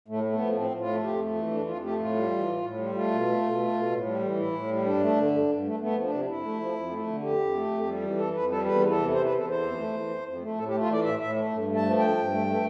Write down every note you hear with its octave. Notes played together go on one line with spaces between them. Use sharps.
A2 A3
A3
B3
F3
A2 C4
A2
F4
A3
F2 G4
A3
E3
F2 D4
E4
F2 F4
A3 G4
A2 F4
G3
E3
A2
A2
G3
A3 F4
B2
A3
B2
A3
B2
A2
G3
E3
A2 E4
A2
G3
G2 D4
A3
D3
G2
G2
A3
A3 B3
F3
D4
C3
F2 E4
A3
F3
F2
A3
D3
F2 G4
F2
A3
F2
G3
E3
F2 A4
F2 B4
G3 A4
E2 B4
E3
A4
C3
E2 C5
B4
E2
A4
E3 C5
F2
A3
E3
F2
F2
A3
A2 A4
G4
A3
F4
E3 D5
A2 E5
A2 E5
A3
G2
A3
A5
F3
G2 G5
G2
A3
A3